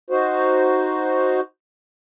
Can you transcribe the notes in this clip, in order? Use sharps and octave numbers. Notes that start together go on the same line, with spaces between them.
D#4 F#4 C5